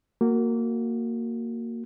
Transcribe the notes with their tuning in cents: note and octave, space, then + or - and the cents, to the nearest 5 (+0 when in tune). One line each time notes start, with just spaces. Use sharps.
A#3 -15 F#4 +0